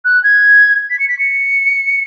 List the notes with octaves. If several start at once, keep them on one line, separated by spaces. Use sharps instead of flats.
F#6
G#6
B6
C#7
B6
C#7